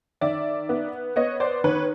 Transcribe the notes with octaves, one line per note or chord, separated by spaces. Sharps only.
D#3 D5 E5
B3
B3 C#5 D#5
C5 D5
D#3 B4 C#5